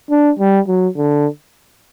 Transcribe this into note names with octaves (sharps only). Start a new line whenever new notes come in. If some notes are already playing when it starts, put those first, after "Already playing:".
D4
G3
F#3
D3